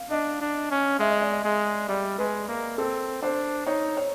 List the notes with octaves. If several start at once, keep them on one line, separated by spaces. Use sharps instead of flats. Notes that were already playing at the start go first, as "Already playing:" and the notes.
Already playing: F5
D4 D#5
D4
C#4
G#3 E5
D#5
D5
D#5
G#3
G3 D5
G#3 B4
A#3 A#4
C4 A4
D4 C5
D#4 C#5
C#5